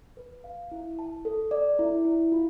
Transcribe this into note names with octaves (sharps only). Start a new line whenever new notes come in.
B4
F5
E4
A5
A4
D5
E4
E4
F4